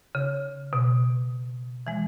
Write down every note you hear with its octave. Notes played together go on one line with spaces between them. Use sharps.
C#3
B2
E3 G#3